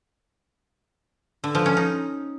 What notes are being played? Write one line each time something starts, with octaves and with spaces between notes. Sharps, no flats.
D3
F3
C#4
D#4